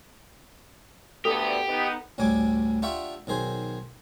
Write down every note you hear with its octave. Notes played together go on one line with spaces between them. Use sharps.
D2 D3 B3 G4 A4
B3 D#4
A1 D2 A2 G3 G#5 D6
D4 F4 G4 E5 F#5 C#6
B1 D#3 G#4 C5